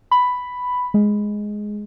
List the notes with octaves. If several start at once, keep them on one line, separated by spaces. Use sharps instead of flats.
B5
G#3